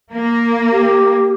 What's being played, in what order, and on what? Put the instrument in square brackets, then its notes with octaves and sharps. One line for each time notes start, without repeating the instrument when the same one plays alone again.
[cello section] A#3
[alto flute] G4